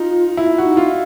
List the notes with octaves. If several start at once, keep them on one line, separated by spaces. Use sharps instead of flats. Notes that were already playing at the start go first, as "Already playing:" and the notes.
Already playing: D#4 F4
E4 F4
F#4
D#4
F4